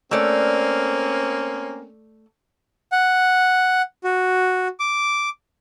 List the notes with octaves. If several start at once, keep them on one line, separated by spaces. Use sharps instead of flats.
A3 A#3 C4 C#4 D5
F#5
F#4
D6